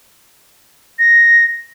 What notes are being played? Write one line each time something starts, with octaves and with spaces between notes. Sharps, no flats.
A#6